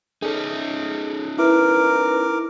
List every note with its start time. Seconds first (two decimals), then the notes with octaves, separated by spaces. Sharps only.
0.22 C#4 D#4 G#4 A4
1.38 E4 A#4 B4 D6